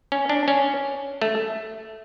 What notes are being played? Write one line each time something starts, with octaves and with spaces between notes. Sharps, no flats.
C#4
D4
C#4
A3